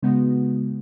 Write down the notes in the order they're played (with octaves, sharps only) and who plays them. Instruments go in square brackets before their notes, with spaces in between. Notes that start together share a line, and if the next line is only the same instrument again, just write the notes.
[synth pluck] C#3 G#3 B3 D#4 F#4